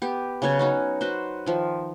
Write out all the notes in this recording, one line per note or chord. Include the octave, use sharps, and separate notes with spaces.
B3 G4
C#3 F#3 B3 C#5
C#4 D#4 F#4
F#4 B4 C5
D#3 F3